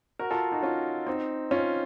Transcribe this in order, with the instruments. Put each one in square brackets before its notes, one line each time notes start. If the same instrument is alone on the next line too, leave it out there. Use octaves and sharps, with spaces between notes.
[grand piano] F#4 A#4
F4 A4
D#4 F#4
C#4 F4
C4 D#4
C#4 F4